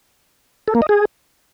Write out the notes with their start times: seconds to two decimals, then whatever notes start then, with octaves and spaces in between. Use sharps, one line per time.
0.68 A4
0.75 A#3
0.82 D#5
0.89 G#4